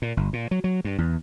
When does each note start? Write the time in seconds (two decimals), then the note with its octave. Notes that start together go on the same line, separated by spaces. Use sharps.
0.02 A#2
0.17 G1
0.33 A#2
0.51 F#3
0.64 F#3
0.85 G2
0.98 E2